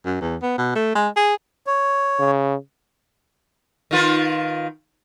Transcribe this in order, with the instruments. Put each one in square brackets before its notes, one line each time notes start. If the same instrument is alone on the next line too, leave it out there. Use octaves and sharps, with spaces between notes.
[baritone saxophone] F#2
E2
B3
B2
A3
G#3
G#4
[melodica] C#5
[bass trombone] C#3
[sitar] D#3 F4 B4